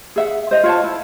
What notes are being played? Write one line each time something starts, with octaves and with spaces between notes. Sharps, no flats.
G#4 E5 F#5
C5 D#5
F4 C#5 A5
E4